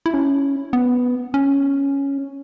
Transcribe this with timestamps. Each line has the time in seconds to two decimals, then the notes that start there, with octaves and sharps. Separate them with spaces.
0.06 E4
0.14 C#4
0.73 B3
1.34 C#4